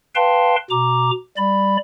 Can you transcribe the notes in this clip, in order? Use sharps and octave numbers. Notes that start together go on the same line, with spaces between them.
B4 F5 G5 A5 C6
B2 A#5 D6
G3 D5 B5